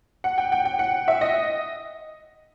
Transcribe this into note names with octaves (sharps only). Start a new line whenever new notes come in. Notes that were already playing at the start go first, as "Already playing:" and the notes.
F#5
G5
G5
G5
F#5
E5
D#5